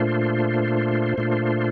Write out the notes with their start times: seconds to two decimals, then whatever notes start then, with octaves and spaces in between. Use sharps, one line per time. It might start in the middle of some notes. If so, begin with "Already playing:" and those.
Already playing: A#2 A3 D4 F4 C5
1.18 A#2 A3 D4 F4